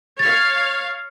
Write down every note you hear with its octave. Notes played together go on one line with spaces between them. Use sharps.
C#5 F5 A6